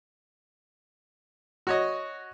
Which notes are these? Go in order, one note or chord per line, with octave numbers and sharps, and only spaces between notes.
F#4 C#5 D#5